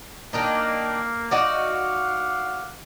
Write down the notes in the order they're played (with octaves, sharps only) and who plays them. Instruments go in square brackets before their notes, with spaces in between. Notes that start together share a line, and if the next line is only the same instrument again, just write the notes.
[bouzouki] D#3 D4 D#4 [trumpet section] A#3
[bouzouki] D#4 F#4 D5 [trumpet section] F5 F#5 D6